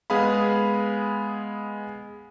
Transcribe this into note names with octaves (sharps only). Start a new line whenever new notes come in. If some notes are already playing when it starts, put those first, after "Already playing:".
G#3 B3 G#4 F5 B5